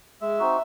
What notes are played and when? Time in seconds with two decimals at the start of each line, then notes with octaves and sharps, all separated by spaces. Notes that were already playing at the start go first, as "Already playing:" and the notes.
0.21 G#3 E5
0.39 C4 D#4 F#4